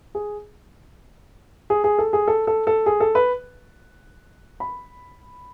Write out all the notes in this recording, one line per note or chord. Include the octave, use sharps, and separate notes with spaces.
G#4
G#4
G#4
A4
G#4
A4
A4
A4
G#4
A4
B4
B5